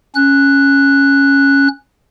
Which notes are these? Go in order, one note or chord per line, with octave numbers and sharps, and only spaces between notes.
C#4 F#6